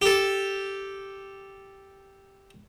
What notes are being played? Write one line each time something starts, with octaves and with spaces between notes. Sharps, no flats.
G4 A4